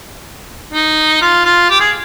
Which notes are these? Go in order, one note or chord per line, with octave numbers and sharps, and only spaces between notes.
D#4
F4
F4
G4
G#4